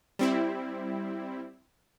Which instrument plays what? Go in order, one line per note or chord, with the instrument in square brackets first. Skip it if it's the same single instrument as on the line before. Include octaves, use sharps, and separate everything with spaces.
[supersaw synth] G3 C4 E4